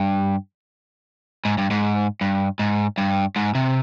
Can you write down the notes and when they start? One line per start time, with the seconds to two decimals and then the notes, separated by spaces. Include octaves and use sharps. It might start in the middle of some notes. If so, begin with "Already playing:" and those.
Already playing: G2
1.45 G#2
1.58 G2
1.71 G#2
2.21 G2
2.59 G#2
2.98 G2
3.36 G#2
3.55 C3